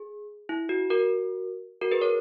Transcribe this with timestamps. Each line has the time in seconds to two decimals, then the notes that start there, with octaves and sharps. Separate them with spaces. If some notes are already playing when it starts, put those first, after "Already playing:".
Already playing: G#4
0.49 E4
0.69 F#4
0.90 F#4 A#4
1.81 F#4 A#4
1.92 G#4 B4
2.01 A#4 C#5